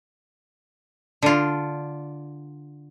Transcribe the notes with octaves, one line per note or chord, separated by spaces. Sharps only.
D3 F4